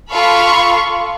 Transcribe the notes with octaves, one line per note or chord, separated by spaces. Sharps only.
F4 A4 F5 B5 C#6